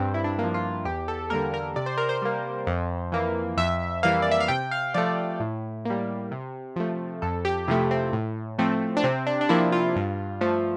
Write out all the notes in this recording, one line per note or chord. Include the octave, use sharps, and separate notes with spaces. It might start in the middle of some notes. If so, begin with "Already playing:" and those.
Already playing: G2 C4
E4
D4
F3 A#3
F4
E2 G4
A4
D3 G3 A#3 A#4
A#4
C3 D5
C5
A#4
C5
G3 A#3
F2
E3 A#3
F2 E5
E3 G3 A#3 F5
D5
E5
F5
C3 G5
F5
F3 A3 D5
A2
G3 A#3
C3
F3 A3
F2 A4
G4
C3 F3 A3 E4
C4
A2
F3 A3 C4
D4
C3 C4
D4
D4
F3 A#3 E4
F4
G2
F3 A3